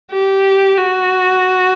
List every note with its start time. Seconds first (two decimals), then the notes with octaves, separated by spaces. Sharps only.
0.12 G4
0.77 F#4